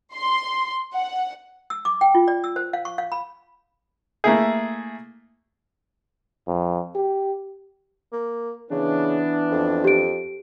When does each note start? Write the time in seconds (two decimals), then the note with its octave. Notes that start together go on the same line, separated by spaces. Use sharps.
0.14 C6
0.95 F#5
1.70 E6
1.85 D6
2.01 G5
2.15 F4
2.28 D5
2.44 E6
2.56 C5
2.73 F5
2.85 C#6
2.98 F5
3.12 B5
4.24 A3 A#3 E4 G#4
6.48 F2
6.95 G4
8.12 A#3
8.71 C#3 E3 B3 D4
9.51 F2
9.84 G4 D7